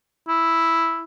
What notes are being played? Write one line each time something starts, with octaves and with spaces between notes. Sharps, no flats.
E4